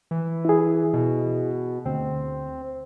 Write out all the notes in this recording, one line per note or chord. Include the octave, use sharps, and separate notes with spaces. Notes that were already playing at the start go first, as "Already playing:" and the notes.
E3
E4 G#4
B2
D2 C4